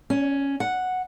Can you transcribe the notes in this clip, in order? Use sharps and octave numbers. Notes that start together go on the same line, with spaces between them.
C#4
F#5